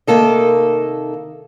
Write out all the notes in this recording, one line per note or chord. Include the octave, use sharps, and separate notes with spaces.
C3 D#3 A#3 A4 D#5